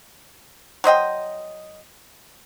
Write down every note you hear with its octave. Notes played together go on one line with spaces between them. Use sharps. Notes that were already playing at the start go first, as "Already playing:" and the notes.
F#3 C5 D#5 G5